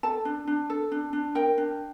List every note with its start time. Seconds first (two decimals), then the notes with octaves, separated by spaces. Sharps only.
0.03 A4 A5
0.25 D4
0.47 D4
0.70 A4
0.92 D4
1.13 D4
1.35 A#4 G5
1.58 D4